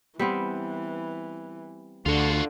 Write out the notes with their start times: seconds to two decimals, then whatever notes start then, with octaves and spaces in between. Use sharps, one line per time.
0.19 E3 G3 B3 C4
2.06 D2 D3 F4 F#4